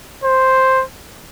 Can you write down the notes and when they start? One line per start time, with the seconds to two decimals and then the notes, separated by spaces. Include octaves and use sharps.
0.24 C5